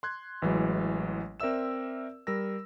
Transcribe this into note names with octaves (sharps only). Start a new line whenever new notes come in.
C6 F#6 G#6
A1 E3 F#3 G#3
C4 A#4 D5 E5 E6 E7
G3 A#4 E6 A#6